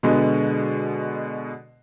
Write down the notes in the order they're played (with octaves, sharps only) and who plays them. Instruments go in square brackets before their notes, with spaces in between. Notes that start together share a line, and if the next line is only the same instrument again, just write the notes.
[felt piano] B2 D3 G#3 B3